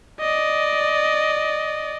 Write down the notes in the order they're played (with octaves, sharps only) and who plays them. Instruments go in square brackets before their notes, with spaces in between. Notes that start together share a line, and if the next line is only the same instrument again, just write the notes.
[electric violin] D5 D#5